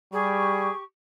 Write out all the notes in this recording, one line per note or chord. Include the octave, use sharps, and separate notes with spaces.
G3 G4 G#4 C#6